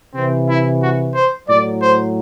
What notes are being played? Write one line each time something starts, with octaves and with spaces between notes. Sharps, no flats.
C3 E3 C4
E4
F#4
C5
A2 F#3 D5
C5